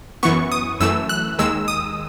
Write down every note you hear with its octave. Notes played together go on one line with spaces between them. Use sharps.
F#2 E3 B3 C#6
D#6
F#2 E3 A3 E6
F#6
D#2 D#3 G#3 E6
D#6